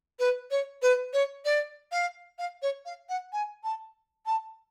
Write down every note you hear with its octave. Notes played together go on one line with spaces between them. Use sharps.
B4
C#5
B4
C#5
D5
F5
F5
C#5
F5
F#5
G#5
A5
A5